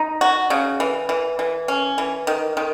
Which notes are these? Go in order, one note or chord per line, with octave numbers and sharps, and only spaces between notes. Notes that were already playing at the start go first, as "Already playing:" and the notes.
Already playing: D#4
F#4
C#3
E3
E3
E3
C#4
E3
D#3
D#3